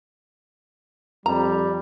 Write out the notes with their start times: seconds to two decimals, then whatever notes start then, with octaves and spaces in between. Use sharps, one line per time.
1.26 F2 G3 A#5